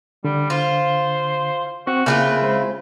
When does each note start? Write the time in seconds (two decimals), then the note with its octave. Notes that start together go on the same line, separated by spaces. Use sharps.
0.24 D3 G3
0.50 F4 C5
1.87 C4 F#4 C#6
2.06 C#3 A#3 C4 E4 F4 F#6
2.42 G#3 C5